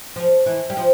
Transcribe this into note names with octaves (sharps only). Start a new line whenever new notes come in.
F3
E3
G3
F3